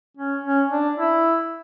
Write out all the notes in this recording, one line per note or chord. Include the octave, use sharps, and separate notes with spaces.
C#4
C#4
D4
E4